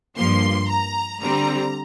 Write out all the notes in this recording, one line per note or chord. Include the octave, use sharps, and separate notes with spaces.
G2 F3 A#3 C6
A#5
D3 G3 C4 A#5